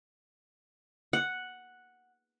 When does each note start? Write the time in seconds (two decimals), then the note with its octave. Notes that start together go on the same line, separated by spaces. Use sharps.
1.13 F#5